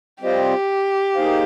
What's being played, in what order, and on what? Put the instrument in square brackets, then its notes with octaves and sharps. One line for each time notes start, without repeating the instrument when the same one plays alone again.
[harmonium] G3 C4 F4 C5 D#5 [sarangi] G4
[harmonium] A#3 D#4 G#4 C5 F5